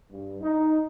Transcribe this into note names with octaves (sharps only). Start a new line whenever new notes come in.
G2
D#4